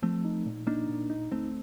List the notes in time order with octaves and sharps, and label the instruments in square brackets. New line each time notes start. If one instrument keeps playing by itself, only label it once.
[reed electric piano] F3 [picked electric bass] A3 C4
[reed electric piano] D#4
A#2
[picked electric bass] A#3 D4 [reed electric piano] D#4
[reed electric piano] A#2
D#4
[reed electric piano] D2 [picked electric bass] A3 C4